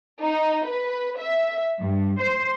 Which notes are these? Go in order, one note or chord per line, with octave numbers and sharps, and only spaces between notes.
D#4
B4
E5
G2
C5